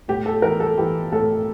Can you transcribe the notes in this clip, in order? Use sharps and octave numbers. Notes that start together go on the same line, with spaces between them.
A2 G4
A4
E3 A#4
A4
E3 G4
A2 A4